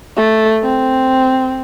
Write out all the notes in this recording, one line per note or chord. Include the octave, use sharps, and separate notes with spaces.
A3
C4